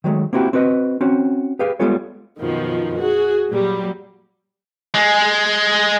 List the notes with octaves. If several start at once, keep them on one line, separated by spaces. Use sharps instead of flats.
D#3 F#3 G#3 A3
A#3 C4 E4 F#4 G4
C4 F#4 B4 D#5
C4 C#4 F#4
G4 G#4 B4 F5
G3 G#3 B3 F4 A4 C#5
F#2 B2 D#3 F3
F#4 G#4
A#2 F#3 G3
G#3